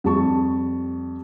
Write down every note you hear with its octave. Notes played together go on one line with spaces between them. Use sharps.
F2 G3 A5 C#6